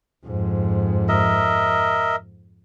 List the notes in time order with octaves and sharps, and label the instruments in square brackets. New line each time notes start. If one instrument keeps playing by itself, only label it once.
[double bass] F2 G#2
[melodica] A#4 D#5 E5